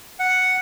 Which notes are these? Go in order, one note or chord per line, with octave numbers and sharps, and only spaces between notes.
F#5